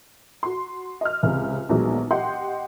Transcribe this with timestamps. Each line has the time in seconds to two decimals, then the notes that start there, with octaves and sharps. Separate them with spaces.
0.43 F#4 C6
1.01 D#5 F6
1.23 C#2 C3
1.69 A#1 D#2 B2 F#3 G#3
2.11 G4 D#5 F#5 C6 G6